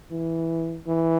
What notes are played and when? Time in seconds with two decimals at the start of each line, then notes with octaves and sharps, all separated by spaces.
0.11 E3
0.87 E3